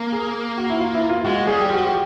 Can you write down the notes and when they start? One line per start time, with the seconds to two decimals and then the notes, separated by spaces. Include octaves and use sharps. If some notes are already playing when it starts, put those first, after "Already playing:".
Already playing: A#3
0.12 G#4
0.57 F#4
0.70 E4
0.80 F4
0.94 E4
1.09 F4
1.24 G#3 F#4
1.47 G3 G#4
1.60 G4
1.69 F3 F#4
1.86 G4